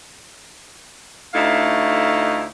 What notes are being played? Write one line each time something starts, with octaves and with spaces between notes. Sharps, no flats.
D2 A3 D#4 E4 F5